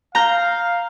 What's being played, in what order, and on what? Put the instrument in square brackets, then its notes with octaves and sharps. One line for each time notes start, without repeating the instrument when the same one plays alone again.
[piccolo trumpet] F5 [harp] A#5 G6